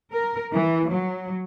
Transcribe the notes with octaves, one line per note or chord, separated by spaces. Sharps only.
A#4
E3
F#3